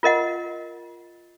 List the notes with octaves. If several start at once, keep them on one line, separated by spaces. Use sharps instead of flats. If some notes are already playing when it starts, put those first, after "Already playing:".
F4 A#4 D#5 F#5